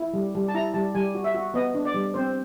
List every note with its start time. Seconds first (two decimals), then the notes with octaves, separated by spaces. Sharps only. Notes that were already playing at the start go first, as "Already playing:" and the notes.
Already playing: E4
0.14 G3
0.35 G3
0.48 A5
0.55 E4 A#5
0.74 G3 A5
0.95 G3 G#5
1.15 F#4
1.24 E5
1.34 F#4
1.54 B3 D#5
1.75 D4
1.85 D5
1.94 G3
2.14 C4 C5